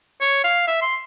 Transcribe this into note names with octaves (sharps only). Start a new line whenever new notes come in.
C#5
F5
E5
C6